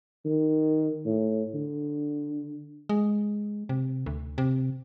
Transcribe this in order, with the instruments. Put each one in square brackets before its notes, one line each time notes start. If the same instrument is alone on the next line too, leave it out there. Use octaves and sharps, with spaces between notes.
[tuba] D#3
A2
D3
[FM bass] G#3
C3
D2
C3